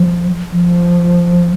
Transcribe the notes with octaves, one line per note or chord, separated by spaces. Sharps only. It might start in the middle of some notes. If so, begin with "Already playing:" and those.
Already playing: F3
F3